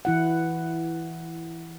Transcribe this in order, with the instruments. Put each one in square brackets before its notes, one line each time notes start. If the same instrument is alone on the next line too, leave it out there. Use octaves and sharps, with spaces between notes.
[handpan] E3 E4 F#5